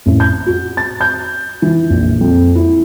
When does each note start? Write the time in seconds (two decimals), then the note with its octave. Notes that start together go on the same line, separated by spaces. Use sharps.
0.06 A1
0.20 G6
0.46 F#4
0.77 A6
1.01 G6
1.62 E3
1.90 A#1
2.21 F2
2.55 E4